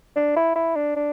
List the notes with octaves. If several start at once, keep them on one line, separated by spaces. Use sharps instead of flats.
D4
E4
E4
D4
D4